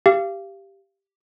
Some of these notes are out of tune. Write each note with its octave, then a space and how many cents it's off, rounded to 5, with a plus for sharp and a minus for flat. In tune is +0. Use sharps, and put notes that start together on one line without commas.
G4 +0 F5 -25